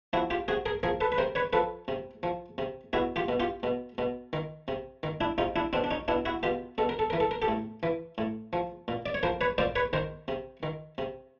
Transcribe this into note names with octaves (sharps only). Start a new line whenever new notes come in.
F3 E4 F#4
F4 G4
C3 F#4 G#4
G#4 A#4
F3 G#4 A#4
A4 B4
B4
C3 A#4 C5
B4 C#5
F3 A4 B4
C3
F3
C3
B2 E4 F#4
F4 G4
B2
F4 G4
B2
B2
D#3
C3
D#3
D4 E4
C3 D#4 F4
D4 E4
B2 C4 D4
D4
C#4 D#4
B2 D4 E4
E4 F#4
B2 F4 G4
B2 A4
A#4
A4
E3 A#4
A4
A#4
G4 A4
A2
E3
A2
F3
A#2
D5
C#5
F3 A#4 C5
B4 C#5
A#2 C5 D5
B4 C#5
D#3 A#4 C5
C3
D#3
C3